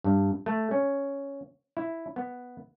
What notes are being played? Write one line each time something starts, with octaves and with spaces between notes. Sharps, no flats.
G2
A3
C#4
E4
B3